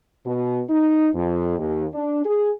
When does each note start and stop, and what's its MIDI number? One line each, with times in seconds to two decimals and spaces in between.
0.25 0.62 47
0.69 1.09 63
1.14 1.56 41
1.58 1.85 39
1.93 2.22 62
2.25 2.50 68